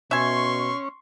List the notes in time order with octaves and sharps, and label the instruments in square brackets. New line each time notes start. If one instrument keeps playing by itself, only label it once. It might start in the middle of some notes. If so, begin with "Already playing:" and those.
[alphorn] B2 [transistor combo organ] C#4 [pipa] E5 G#5 [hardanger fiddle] C6 C#6